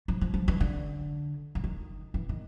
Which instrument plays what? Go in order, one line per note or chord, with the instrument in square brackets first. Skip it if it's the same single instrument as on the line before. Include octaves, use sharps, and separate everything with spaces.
[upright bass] F3
F3
F3
E3
D3
D3
D#3
E3
D#3